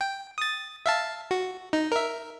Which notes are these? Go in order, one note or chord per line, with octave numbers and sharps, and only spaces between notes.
G5
D#6 A6
E5 F5 A5
F#4
D#4
A#4 E5